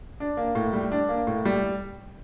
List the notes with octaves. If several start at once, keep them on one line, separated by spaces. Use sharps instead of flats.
D4
A#3
A2
G3
D4
A#3
A2
G3